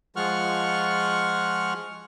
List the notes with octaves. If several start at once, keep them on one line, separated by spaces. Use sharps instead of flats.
F3 G#3 F4 F#5 C#6 F6